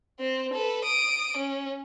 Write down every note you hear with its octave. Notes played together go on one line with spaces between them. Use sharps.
C4 C5
A4 B4
D#6 D7
C#4